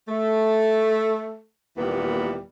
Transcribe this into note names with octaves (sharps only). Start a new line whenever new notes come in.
A3
D#2 A#2 E3 G3 B3